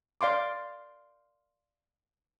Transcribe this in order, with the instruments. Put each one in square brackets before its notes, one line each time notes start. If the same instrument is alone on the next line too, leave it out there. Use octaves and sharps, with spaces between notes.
[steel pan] D5 F5 C6 D6